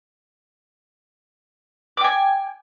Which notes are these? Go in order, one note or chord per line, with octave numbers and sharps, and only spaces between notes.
G5 G#5 D6